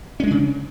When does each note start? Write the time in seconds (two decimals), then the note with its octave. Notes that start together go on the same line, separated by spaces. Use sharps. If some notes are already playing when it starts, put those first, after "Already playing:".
0.20 C#4
0.23 G#3
0.27 D4
0.31 C#3